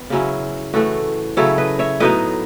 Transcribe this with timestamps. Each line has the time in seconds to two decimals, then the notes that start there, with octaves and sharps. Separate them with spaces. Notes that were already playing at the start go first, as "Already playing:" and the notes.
Already playing: B3
0.10 C#3 F#3 C#4 E4
0.74 A2 E3 A3 F#4 A4
1.37 C#3 F#3 A3 E4 A4 C#5
1.58 B4 D#5
1.79 C#5 E5
2.00 A2 F#3 B3 D#4 B4 D#5